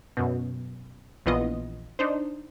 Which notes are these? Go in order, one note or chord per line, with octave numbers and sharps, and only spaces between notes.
F#2 B2
A#1 E3 B3 F4 D#5
D4 D#4 C5